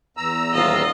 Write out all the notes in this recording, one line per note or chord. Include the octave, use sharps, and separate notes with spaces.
E2 A#5 E6
D#1 F4 D#5